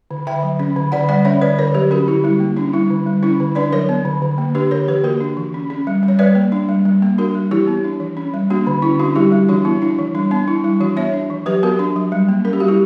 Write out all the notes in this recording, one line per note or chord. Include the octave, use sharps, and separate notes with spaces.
D3
D3 E5 G5
F#3
C#4
D3
D3 D5 F#5
G3 D5 F#5
C#4 C#5 E5
D3 B4 D5
D3 A#4 C#5
F#3 G4 B4
C#4 F#4 A#4
D3 E4 G4
G3 E4
A#3
C#4 D4
G3 E4
D3
G3
C#4 E4
D3
D4 B4 D5
F#3 A#4 C#5
B3
D3
D3
A#3
D4 G4 B4
D3 A#4 C#5
E3 G4 B4
A#3 F#4 A#4
D4
E3
C#4
C#4
G3
G3
C#5
G3 B4 D5
A#3
D4
G3
G3
A#3
D4 F#4 A#4
G3
E3 E4 G4
B3
D4
E3
C#4
G3
A#3 D4 F#4
D3
C#4 E4
C#4 D4 F#4
G3 E4 G4
G3
E3 D4 F#4
B3 E4
D4 E4
E3
G3 D4
B3 D4
D4 E4
G3 E4
E3 D4 F#4
B3 C#5 E5
D4
E3
F#3 G4 B4
B3 F#4 A#4
D4
F#3
G3
A#3
C#4 A#4
G4
G3 F#4
E4 G4